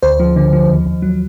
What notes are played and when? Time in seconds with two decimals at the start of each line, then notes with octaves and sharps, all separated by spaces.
0.03 D2 C5
0.20 F3
0.36 D3
0.53 F3
0.69 D#2
0.86 D#2
1.02 F#3